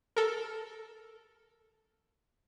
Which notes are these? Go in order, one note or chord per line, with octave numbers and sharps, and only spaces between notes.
A4 A#4